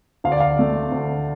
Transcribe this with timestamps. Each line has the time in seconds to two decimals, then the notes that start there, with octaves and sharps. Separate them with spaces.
0.24 D2 F5
0.32 D5
0.40 F5
0.59 A3
0.92 D2